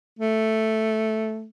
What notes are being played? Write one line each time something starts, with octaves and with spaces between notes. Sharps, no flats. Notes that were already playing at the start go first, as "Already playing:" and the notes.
A3